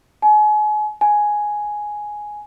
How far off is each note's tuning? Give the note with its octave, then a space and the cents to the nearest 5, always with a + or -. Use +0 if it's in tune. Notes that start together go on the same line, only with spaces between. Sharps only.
G#5 +35
G#5 +5